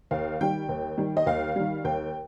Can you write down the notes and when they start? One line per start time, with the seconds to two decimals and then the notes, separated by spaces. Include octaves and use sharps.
0.11 D#2 F5
0.41 D#3 G3 G5
0.69 D#2
0.98 D#3 G3
1.17 D#5
1.26 D#2 F5
1.56 D#3 G3
1.84 D#2 G5